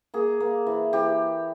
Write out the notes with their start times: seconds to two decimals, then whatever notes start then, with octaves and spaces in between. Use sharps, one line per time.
0.14 A#3 G#4
0.40 A#3
0.67 E3
0.93 E3 G4